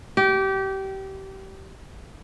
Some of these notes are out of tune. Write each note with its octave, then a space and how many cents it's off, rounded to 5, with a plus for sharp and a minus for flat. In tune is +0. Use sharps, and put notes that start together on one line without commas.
G4 -25